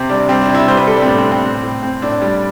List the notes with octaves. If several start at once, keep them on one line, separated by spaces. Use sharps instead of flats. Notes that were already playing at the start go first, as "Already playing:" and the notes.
Already playing: C3 C4
G3 D4
G3 C4
D4
C3
E4
G3 C5
B4
G3 A4
D4
C4
A2 B3
C4
A2
C4
A2
A2
A2 C4
A2 D4
G3